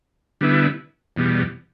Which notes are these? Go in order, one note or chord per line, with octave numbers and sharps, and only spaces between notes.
D3 G3 B3 E4
E2 B2 G3